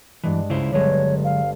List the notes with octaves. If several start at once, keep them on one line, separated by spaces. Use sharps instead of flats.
G2 E3 G#3 D4
C#2 C#3 E4 C5 B5
G1 D3 F#3 G#3 B4 C#5 A#5
F5